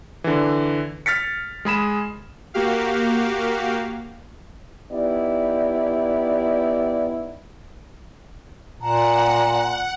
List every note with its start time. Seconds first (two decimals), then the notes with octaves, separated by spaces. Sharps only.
0.24 D3 E3
1.06 F6 A6 B6 C#7
1.65 G#3 G#4 B5 E7
2.54 A#3 F#4 G4 F5
4.91 B3 D#4 E4 G4 D5
8.80 A#2 F5 F#5 A5 A#5